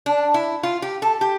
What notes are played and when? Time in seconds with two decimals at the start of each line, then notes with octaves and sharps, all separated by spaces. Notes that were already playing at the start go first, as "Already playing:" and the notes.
0.06 D4
0.34 E4
0.63 F4
0.82 G4
1.02 A4
1.21 G4